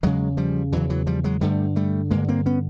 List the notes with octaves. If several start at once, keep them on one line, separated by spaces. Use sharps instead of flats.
E2 C#3 F#3 G#3
F3 G3
E2 C#3 E3 F#3
E3 F#3
F3 G3
F#3 G#3
G2 D3 G3 A3
G3 A3
G2 D3 G#3 A#3
A#3 C4
B3 C#4